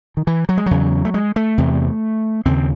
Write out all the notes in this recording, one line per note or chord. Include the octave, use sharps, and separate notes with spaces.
D#3
E3
F#3
G#3
E2 C#3 F#3
A3
G#3
A3
E2 C3
D#2 C#3 C4